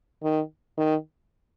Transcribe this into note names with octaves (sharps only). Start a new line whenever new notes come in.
D#3
D#3